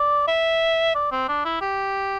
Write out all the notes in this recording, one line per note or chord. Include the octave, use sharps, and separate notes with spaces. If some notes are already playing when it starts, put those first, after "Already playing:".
Already playing: D5
E5
D5
C4
D4
E4
G4